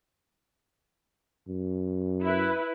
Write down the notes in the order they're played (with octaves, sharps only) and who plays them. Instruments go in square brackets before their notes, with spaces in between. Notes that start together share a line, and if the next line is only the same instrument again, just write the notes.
[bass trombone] F#2
[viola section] E4 B4